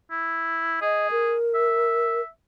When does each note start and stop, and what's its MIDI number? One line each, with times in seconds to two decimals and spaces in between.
0.11 0.79 64
0.82 1.35 68
0.82 1.08 75
1.11 2.21 70
1.55 2.28 76